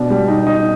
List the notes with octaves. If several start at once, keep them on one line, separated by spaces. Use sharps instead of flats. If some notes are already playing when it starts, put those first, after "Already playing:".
Already playing: B2 D4
G3
D#4
D#4